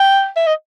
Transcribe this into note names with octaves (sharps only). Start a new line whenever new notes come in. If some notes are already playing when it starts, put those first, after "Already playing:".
Already playing: G5
E5
D#5